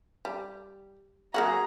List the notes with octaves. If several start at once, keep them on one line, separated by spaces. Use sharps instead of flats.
G3
F#3 A#3 F#4 G#4 A#5